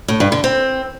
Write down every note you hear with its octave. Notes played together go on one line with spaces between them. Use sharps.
A2
G2
D3
C4